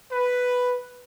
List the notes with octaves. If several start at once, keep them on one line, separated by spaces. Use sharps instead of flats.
B4